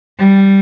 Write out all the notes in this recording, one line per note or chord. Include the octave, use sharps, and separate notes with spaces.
G3